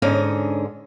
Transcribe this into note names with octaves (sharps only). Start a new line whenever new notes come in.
G#2 D3 C#4 D#5